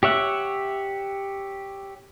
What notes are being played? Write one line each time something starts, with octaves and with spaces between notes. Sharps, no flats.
G4 C#5 E5 F#5